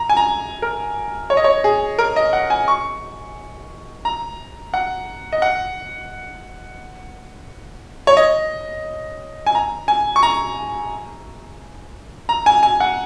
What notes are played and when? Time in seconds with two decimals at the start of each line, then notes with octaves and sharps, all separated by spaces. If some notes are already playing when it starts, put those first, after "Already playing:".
Already playing: A#5
0.09 G#5
0.17 A#5
0.62 A#4
1.30 C#5
1.37 D#5
1.44 C#5
1.64 G#4
1.99 A#4
2.16 D#5
2.33 F#5
2.50 G#5
2.68 C#6
4.05 A#5
4.74 F#5
5.32 D#5
5.42 F#5
8.07 C#5
8.17 D#5
9.46 G#5
9.55 A#5
9.88 G#5
10.16 C#6
10.23 A#5
12.29 A#5
12.46 G#5
12.63 G#5
12.80 F#5